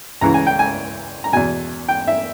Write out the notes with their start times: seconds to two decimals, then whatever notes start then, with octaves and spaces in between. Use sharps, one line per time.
0.21 C#2 C#3 E3 A#5
0.34 G#5
0.47 G5
0.59 G#5
1.24 A#5
1.33 E2 B2 G#5
1.89 G5
2.08 E5